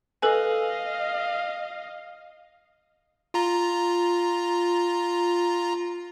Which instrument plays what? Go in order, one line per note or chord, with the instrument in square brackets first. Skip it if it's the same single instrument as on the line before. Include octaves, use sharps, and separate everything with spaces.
[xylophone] A4 B4 G#5 [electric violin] D#5 F5
[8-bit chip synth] F4 A#5